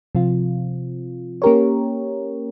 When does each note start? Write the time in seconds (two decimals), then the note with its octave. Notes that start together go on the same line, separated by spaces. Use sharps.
0.15 C3 F3 C4 F4
1.42 A#3 C#4 G4 A#4 C#5